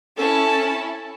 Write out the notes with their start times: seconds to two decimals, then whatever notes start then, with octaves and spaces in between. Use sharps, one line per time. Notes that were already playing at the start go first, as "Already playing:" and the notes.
0.18 C#4 E4 A4 A5